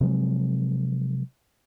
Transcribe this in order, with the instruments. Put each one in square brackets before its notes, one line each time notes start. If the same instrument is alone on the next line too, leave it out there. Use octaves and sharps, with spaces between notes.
[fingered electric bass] C3 F3 F#3 G#3